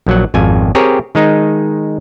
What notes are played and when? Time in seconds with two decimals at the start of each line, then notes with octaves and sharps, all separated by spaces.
0.07 A#1 F#3 F#5
0.34 G#1 F2 G#5
0.75 C4 G4 G#4 A#4 C#5
1.15 D#3 G#3 D#4